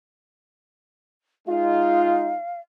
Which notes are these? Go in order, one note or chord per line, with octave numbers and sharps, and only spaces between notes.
G#3 D#4 F4 F5